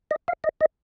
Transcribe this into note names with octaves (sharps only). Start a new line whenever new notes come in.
D#5
F5
D#5
D#5